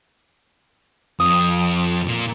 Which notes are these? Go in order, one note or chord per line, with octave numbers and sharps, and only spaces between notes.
F2 D#6
A#2